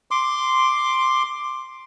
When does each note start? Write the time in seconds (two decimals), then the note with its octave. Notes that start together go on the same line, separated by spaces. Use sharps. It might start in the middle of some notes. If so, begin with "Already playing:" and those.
0.11 C6 D6